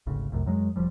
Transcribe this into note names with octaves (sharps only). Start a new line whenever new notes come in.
G#1 D2 C#3
F1 C2 F#2 A2
F#2 F#3 G#3
E1 F3 G3